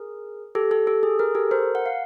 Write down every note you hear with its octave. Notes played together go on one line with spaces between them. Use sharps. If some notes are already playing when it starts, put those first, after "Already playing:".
Already playing: G#4 A#4
G4 A4
G4 A4
G4 A4
G#4
G#4 A#4
G4 A4
A#4 C5
F#5
F5